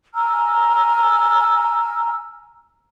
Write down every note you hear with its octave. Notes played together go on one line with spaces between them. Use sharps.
G#5 A#5 E6 F6